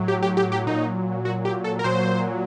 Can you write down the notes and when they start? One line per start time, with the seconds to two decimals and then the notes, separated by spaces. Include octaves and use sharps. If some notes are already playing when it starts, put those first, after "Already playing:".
Already playing: A2 F#3
0.08 G4
0.22 G4
0.37 G4
0.52 G4
0.67 A#2 F#3 D#4
1.25 F#4
1.45 G4
1.64 A4
1.79 A#4
1.84 A#2 F#3 C5